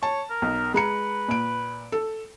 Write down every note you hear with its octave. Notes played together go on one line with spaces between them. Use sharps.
C#5 A5
A#4
B1
G#3 B4 A#5 C#7
A#2 D7
A4